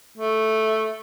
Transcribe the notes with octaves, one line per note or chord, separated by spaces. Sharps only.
A3